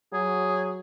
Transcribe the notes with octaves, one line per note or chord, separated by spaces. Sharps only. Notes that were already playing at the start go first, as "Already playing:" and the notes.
F#3 G#4